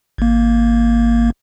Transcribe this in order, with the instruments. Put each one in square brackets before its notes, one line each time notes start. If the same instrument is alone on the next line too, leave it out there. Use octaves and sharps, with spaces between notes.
[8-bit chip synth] G#1 A#3